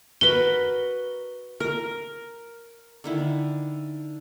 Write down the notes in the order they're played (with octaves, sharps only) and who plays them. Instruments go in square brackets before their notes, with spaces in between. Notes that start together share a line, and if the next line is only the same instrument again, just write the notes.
[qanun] F#4 A#4 B4 [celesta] G7
[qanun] A#4
D3 D#3 E4